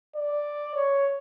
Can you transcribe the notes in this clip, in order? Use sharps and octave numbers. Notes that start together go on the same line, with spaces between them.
D5
C#5